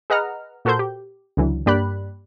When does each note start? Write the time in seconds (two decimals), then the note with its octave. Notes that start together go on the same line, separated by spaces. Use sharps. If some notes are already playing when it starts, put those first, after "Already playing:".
0.10 G#4 B4 D#5 F#5 A#5 F6
0.65 A#2 F#4 A4 A#4 C5 G6
0.79 G4
1.37 C#2 D3 E3 F#3
1.66 G2 A#3 G4 D5 B5 F#6